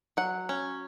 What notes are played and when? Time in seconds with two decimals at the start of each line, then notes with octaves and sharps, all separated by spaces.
0.17 F#3 F#5
0.49 C#4